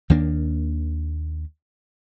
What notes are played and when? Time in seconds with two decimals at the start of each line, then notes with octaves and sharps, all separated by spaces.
0.10 D#2 D#3 A#3 D4